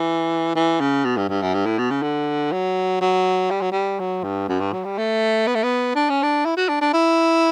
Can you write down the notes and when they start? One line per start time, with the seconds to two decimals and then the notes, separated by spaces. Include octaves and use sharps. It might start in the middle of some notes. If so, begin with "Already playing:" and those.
Already playing: E3
0.55 E3
0.80 C#3
1.04 B2
1.16 G2
1.29 G2
1.42 F#2
1.54 G2
1.66 A2
1.78 B2
1.90 C#3
2.02 D3
2.52 F#3
3.01 F#3
3.50 G3
3.61 F#3
3.72 G3
3.99 F#3
4.23 G2
4.48 F#2
4.60 G2
4.73 F#3
4.84 G3
4.98 A3
5.47 B3
5.55 A3
5.63 B3
5.95 D4
6.09 C#4
6.22 D4
6.45 E4
6.56 F#4
6.69 D4
6.81 D4
6.93 E4